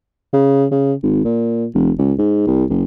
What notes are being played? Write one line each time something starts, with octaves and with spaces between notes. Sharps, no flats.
C#3
C#3
G#1
A#2
F1
C#2
G#2
C2
F#1